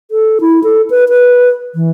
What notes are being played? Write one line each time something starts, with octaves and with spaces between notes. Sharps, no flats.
A4
E4
A4
B4
B4
E3